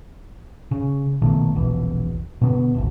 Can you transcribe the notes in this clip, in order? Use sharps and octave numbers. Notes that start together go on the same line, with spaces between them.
C#3
A#1 B2 D#3 A3
E1 A#1 B2 E3
B2 D3 A#3 B3
G#1 D2